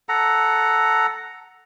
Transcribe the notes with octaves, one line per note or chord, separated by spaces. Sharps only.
A4 F#5 A#5